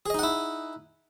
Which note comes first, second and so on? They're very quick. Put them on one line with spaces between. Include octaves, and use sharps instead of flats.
G#4 D#5 D#4 F#5 E4